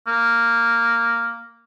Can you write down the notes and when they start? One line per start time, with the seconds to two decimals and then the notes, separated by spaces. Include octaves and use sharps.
0.07 A#3